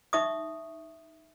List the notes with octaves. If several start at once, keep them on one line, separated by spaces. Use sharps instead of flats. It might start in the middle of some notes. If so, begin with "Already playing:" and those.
D#4 E5 C#6 D#6